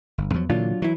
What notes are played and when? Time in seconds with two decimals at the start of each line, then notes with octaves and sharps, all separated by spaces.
0.18 G1
0.34 E2 F3 F#3
0.50 A#2 D3 E3 F#3 D4 F4
0.82 E3 F#3 E4